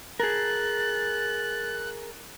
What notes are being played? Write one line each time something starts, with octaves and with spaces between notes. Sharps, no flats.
G#4 A#4 F#6 A6